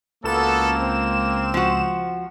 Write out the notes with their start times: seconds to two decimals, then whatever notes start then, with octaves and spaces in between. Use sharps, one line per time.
0.24 C#2 A#3 B3 F#4 A4 E7
0.77 C4
1.54 F3 F#4